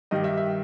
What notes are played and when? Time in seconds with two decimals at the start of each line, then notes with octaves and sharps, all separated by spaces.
0.11 G2 D#3 G3 D#5
0.24 E5
0.38 E5